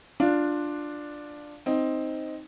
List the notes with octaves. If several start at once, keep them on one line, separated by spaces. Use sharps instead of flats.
D4 F4
C4 D#4